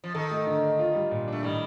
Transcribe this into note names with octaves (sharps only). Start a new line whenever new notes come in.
F3
D#3 A4
A3
D3
D4
F4
G3
A#2
A3 D4
A2 D#3 G3